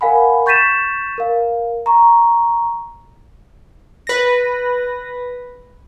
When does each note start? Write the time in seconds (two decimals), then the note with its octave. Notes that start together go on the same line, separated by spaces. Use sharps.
0.01 A#4 F5 F#5 G#5 B5
0.46 C#6 G6 A6 B6 D#7 E7
1.18 A#4 F5
1.86 A#5 C#6
4.07 B4 A#6